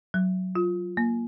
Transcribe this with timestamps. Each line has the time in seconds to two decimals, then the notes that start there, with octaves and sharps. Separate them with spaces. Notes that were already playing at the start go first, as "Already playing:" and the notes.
0.14 F#3
0.55 F4
0.97 A#3